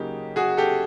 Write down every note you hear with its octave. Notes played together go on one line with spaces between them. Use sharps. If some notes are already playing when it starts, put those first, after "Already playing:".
Already playing: C#3 F#3 A#3 D#4 G4
F#4 G#4
G4 A4